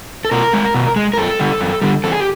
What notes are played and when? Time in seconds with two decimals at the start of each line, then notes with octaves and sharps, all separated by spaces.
0.25 A4
0.31 B2 A#4
0.53 G#3
0.74 B2
0.96 G#3
1.13 A#4
1.18 F#2 A4
1.39 D3 G3
1.61 F#2
1.82 D3 G3
2.04 E2 A4
2.12 G#4
2.20 G4